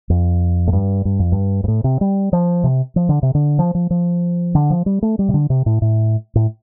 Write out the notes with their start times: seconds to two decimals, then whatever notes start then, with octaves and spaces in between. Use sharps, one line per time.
0.10 F2
0.67 A2
0.73 G2
1.05 G2
1.19 F2
1.32 G2
1.64 G2
1.68 A2
1.84 C3
2.01 G3
2.33 F3
2.64 C3
2.96 F3
3.09 D3
3.23 C3
3.35 D3
3.59 F3
3.75 F3
3.90 F3
4.55 D3
4.70 F3
4.86 G3
5.02 A3
5.19 G3
5.29 C3
5.34 D3
5.50 C3
5.66 A2
5.82 A2
6.35 A2